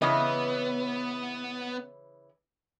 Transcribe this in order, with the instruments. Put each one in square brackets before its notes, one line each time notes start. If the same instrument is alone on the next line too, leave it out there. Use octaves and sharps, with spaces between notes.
[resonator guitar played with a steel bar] C#3 E3 D#5 [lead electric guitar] B3